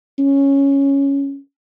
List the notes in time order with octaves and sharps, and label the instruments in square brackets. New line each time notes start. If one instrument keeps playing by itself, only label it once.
[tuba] C#4